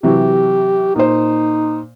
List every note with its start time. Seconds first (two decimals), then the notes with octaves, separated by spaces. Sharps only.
0.03 C3 E3 F#3 G4
0.96 A#2 D#4 C5